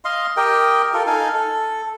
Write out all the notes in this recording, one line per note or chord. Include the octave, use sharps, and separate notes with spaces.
D#5 F5 C6
G4 A#4 D#5 G5
F4 A4 A#4
D#4 A4 F5 G#5
A4